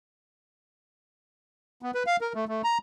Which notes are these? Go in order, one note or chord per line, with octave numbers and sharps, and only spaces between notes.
B3
B4
F5
A#4
A3
A3
A#5